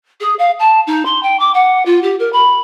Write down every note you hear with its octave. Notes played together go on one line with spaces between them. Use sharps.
G#4
F5
A5
D#4
C6
G5
D6
F#5
F4
G4
A#4
B5